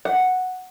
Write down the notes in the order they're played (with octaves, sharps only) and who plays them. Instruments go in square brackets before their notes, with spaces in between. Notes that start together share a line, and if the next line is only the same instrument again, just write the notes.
[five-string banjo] F#5